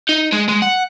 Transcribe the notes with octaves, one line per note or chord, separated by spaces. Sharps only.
D#4
G#3
G#3
F#5